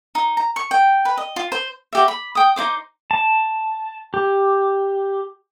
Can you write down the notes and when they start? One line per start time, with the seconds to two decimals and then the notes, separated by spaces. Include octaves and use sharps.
0.15 D#4
0.37 A#5
0.56 C#6
0.71 G5
1.05 B4
1.18 D#5
1.36 F4
1.52 C5
1.93 F#4 G4 E5
2.08 B5
2.35 G5 D#6
2.56 D#4 E4 C5 D6
3.11 A5
4.14 G4